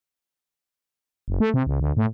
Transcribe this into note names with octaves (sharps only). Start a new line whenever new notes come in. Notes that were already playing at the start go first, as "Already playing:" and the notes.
F#1
A3
C3
C#2
D2
A2